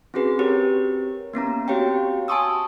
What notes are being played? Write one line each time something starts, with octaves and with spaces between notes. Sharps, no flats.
C4 C#4 F#4 G#4 B4
C4 G4 A#4 C#5
A#3 B3 C#4 A#5
C4 F#4 G4 C#5 F5 G5
G#5 A5 C6 C#6 D#6 E6